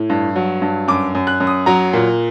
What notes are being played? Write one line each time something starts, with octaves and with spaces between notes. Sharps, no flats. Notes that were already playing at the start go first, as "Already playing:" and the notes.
Already playing: A2
G2
F#3
G2
F#2 D6
F#2
F#6
F#2
D#6
F#3 A#5
A#2